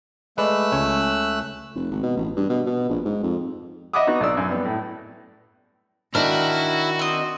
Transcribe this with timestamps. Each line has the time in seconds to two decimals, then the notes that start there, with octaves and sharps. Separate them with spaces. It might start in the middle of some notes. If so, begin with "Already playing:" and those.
0.38 G#3 A3 B4 D5 E6 F#6
0.72 C#2 C#4 G#5
1.75 F1
1.91 G#1
2.03 B2
2.17 A1
2.36 G2
2.49 B2
2.66 B2
2.89 A#1
3.05 G#2
3.23 F2
3.93 D#5 E5 F#5 B5 D6 D#6
4.07 B3 D#4 F#4
4.20 B1 D5 E6
4.37 F#2
4.51 G3 B3
4.65 A2
6.15 D#3 D4 E4 F#4 F6
6.99 C4 D#5